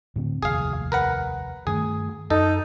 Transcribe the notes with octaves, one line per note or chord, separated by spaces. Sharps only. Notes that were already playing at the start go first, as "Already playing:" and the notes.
A2 D3 C4
F1 A#1 D#2 G#4 F5
A#4 B4 F#5
G2 D#3 A3 G#4
F#2 D#4 A4